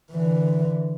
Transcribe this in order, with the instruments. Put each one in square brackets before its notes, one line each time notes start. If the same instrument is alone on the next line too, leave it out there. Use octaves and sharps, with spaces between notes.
[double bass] D3 E3